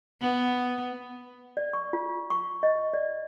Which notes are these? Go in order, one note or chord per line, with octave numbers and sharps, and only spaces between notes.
B3
D5
C#6
F4
C#6
D#5
D5